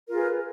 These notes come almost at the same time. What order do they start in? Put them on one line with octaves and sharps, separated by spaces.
A#4 F4 G#4 B4